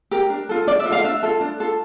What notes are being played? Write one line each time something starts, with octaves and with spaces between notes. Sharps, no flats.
G4 A#4
D4
F4 A4
D4 D5
E5
F4
A4 F5
D4 E5
F4 A4
D4
F4 A4